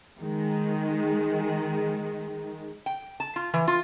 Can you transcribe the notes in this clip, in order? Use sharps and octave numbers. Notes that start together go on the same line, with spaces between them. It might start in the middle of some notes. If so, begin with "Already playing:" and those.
D#3 G#3
G5
A5
F4
E3
F4